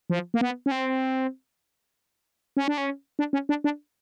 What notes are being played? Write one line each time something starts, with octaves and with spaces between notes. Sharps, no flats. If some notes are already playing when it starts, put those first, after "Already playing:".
F3
A#3
B3
C#4
C4
C#4
D4
C#4
D4
C#4
D4
D4